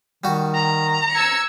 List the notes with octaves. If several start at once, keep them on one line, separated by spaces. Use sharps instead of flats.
D#3 G3 F#4
A#5
E6 G#6 C#7